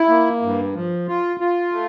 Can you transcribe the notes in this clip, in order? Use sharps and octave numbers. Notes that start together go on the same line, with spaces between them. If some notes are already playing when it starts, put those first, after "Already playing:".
Already playing: E4
A#3
G2
F3
F4
F4
A3